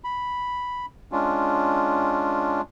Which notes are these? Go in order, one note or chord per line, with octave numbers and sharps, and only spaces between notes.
B5
G#3 C#4 D4 F4